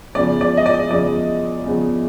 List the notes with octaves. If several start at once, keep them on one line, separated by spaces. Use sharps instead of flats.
E2 C#3 F3 D5
D5
D#5
D5
E2 C#3 F3 D5
E2 C#3 F3